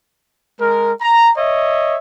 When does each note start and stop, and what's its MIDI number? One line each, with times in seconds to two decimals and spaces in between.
0.60 0.92 56
0.60 0.92 70
1.01 1.31 82
1.37 1.97 73
1.37 1.97 75
1.37 1.97 76